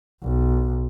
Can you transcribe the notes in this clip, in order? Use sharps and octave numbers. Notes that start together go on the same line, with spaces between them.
B1